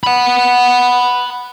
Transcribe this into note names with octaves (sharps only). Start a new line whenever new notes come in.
F#5 B5